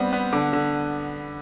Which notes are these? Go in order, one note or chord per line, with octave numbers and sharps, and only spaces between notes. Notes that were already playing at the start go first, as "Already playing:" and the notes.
Already playing: G3 B3 C4
B3
D3 D6
D3